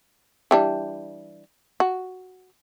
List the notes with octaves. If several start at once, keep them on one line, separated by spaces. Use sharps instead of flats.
E3 G3 D4
F#4